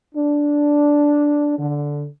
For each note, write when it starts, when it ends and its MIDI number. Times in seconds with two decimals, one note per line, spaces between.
0.15 1.54 62
1.59 2.06 50